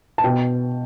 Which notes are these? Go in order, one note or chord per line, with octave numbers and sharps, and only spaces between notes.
A5
B2 G5